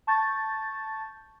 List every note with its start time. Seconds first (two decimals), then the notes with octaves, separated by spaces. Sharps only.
0.07 A5 C#6 G6 A6